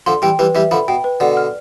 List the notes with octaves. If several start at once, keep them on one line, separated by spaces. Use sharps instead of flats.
D3 F3 C6
E3 G3 G5
E3 G3 B4
E3 G3 E5
D3 F3 B5
B2 G5
B4
B2 D3 D5
F6